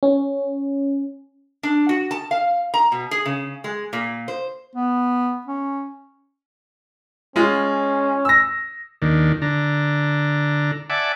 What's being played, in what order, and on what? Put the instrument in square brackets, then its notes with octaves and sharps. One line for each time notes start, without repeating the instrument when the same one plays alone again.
[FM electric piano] C#4
[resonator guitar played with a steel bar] D4
F#4
A5
F5
A#5
B2
G#4
C#3
G#3
A#2
C5
[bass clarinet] B3
C#4
[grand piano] G#3 F4 [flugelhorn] C#4
[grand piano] E6 A#6
[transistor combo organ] D#2 D#3 D4
D3 D4 A#5
D5 E5 F#5 G#5 A5 D6